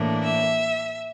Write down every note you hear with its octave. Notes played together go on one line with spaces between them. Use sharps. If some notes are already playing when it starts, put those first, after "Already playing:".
Already playing: A2 E3 A#3 D4
E5